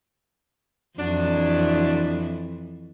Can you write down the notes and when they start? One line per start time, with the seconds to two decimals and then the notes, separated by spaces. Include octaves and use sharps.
0.99 F2 E3 F#3 D4 E4